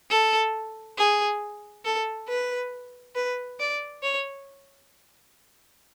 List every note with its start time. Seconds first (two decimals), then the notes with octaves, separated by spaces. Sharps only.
0.10 A4
0.98 G#4
1.85 A4
2.28 B4
3.15 B4
3.60 D5
4.03 C#5